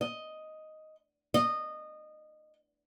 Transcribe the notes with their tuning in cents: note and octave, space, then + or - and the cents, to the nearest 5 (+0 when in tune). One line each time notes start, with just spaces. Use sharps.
D#5 +5
D#5 -20